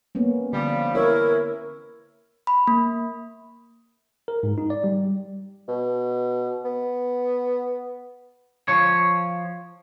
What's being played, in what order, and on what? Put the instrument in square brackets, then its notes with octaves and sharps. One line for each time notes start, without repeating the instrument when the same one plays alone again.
[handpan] A#3 B3 C#4
[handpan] D3 [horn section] F3 G3
[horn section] E3 B3 E4 [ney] A#4 [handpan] C#5
[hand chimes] B5
A#3
[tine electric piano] A#4
G#2
D#4
D5
G3
[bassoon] B2
B3
[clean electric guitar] F3 C#5